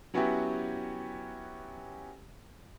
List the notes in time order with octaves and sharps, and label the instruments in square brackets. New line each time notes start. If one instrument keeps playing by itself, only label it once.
[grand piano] F#3 B3 C#4 E4 F#4 G4